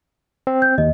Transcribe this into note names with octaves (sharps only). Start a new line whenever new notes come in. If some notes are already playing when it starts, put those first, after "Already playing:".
C4
G6
D#2 D#5